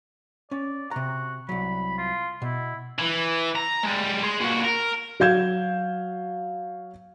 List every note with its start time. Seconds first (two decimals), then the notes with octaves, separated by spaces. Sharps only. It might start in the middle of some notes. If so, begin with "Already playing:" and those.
0.51 C#4 D5
0.91 C3 F#4 A#5
1.49 C2 F#3 B5
1.98 F4
2.42 B2 E4
2.98 E3
3.55 A#5
3.83 G3 G#3
4.23 G#4 C6
4.41 A#2 F#4
4.65 A#4
5.20 F#3 F5 G6 G#6 E7